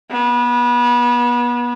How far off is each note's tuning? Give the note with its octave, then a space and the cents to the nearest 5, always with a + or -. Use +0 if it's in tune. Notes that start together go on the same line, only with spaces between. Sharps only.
B3 -30